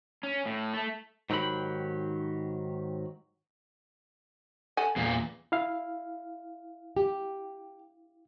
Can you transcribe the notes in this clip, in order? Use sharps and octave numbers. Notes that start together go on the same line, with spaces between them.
C#4
A2
A3
G#2 D#3 F#3 G4 B5
A4 F#5 G#5
E2 A#2
E4 F5
G4